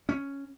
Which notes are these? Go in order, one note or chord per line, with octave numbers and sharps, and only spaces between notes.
C#4